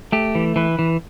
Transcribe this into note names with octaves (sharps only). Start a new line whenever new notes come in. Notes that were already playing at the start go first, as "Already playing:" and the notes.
A3 G4
E3
E3 B4
E3